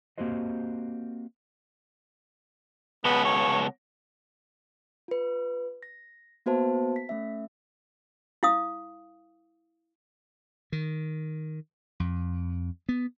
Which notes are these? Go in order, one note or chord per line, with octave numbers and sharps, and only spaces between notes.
A#3 C4 F#4 G4 C5 D#5
C#2 B2 B3
C#5
F4 B4
A#6
A#3 B3 F#4 B4 C5 A5
B6
A3 C#4 E5
E4 F5 D#6
D#3
F2
B3